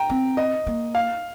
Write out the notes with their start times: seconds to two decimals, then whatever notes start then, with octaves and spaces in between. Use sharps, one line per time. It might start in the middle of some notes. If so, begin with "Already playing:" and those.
Already playing: G5 A#5
0.10 C4
0.37 D#5
0.67 A#3
0.95 F5